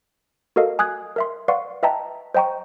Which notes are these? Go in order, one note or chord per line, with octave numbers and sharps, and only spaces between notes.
F#4 A4 A#4 D#5 F5
G#5 D#6 F#6 G#6
A#4 E5 C6
B4 D5 F5 F#5 C6 C#6
B4 D#5 E5 G5 A5 A#5
C5 D#5 G5 A#5 C#6